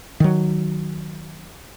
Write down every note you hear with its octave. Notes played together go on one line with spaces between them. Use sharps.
D#3 F#3